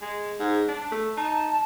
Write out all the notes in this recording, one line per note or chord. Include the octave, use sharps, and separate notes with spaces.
G#3
G#2
D4
A3
D#4 A5